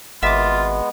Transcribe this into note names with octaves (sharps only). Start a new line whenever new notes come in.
G#1 G#3 B3 F4 E5 D6